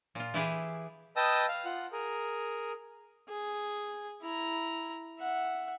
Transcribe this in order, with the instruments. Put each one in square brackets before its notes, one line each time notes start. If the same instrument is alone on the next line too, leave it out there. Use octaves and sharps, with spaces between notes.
[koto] A#2 F4
E3 E4 G4 G#4
[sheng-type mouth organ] B4 D#5 G5 A5 D#6 E6
F5
F4 F#5
G#4 A#4
[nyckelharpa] G#4
E4 A#5
E5 F#5